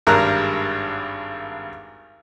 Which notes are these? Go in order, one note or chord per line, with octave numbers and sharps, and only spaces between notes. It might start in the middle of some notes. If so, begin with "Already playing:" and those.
G#1 G2 A#4 A#5 F#6